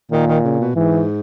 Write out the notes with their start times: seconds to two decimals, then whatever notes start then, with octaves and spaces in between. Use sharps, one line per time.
0.12 A#2 D#3
0.27 D#3
0.44 C#3
0.60 B2
0.75 G#2 E3